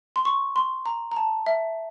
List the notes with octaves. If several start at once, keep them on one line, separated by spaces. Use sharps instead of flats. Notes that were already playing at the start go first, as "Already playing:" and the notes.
C6
C#6
C6
A#5
A#5
A5
E5